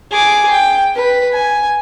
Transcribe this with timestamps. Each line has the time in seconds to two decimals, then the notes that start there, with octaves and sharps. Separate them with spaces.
0.12 G#4 D6
0.50 G5
0.96 B4
1.33 G#5